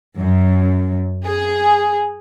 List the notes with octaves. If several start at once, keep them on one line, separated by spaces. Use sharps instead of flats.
F#2
G#4